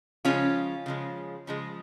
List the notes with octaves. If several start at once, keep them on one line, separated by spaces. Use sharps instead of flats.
C#3 F3 G#3 C#4 F4
C#3 F3 G#3
C#3 F3 G#3